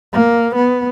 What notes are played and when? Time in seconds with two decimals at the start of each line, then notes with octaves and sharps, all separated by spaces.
0.13 A#3
0.55 B3